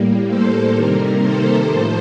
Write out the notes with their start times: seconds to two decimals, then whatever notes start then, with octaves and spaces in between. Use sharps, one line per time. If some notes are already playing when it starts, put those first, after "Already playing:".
Already playing: A2 G3 A#3
0.26 A4 C5
0.73 C3 D#3 G3 A#3 A#4
1.21 A4 C5
1.68 A2 F3 A3